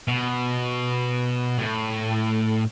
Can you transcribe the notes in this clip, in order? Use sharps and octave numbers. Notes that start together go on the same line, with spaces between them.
B2
A2